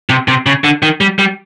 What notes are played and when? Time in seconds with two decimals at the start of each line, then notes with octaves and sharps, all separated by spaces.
0.10 C3
0.28 C3
0.46 C#3
0.64 D3
0.82 D#3
1.01 G3
1.19 G3